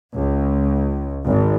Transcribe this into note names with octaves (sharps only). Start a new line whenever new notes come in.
C#2
G#1